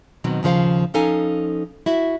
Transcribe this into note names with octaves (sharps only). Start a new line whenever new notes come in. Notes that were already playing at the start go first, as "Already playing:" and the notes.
B2 D#3 F#3 C4
D#2 C#3 F3 C5 F5
F3 C#4 D#4 A4 F5 G#5
E4 F#4 E5